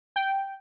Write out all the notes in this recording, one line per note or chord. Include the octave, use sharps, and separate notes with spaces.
G5